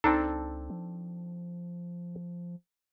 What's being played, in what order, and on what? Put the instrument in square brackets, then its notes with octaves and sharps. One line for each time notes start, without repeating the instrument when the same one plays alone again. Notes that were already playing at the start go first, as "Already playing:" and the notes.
[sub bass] C#2 [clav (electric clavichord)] C4 D4 A4 [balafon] D#4
[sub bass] F3